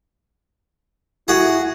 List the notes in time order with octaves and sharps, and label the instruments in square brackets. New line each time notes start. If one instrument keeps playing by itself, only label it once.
[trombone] E4 [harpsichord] F#4 G#4